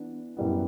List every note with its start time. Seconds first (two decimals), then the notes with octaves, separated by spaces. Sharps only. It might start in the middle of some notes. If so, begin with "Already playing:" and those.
Already playing: E3 B3 D4
0.37 F#2 E3 G3 B3